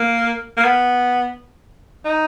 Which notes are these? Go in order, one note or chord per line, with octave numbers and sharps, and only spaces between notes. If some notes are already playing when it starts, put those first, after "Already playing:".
Already playing: A#3
A#3
B3
D#4